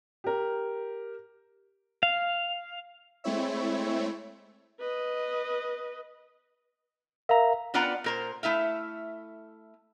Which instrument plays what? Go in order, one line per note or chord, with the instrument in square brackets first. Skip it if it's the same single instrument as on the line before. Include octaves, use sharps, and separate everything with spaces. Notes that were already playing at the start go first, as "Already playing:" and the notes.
[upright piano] G4 A#4
[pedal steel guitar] F5
[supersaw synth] G#3 A3 C4 E4 C#5 E5
[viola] B4 D#5
[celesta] A#4 F5 [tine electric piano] E5 A#5
[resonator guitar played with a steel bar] B3 D4 F4 D5 F#5 A#5
A#2 A#4 C5
A3 E4 E5 F5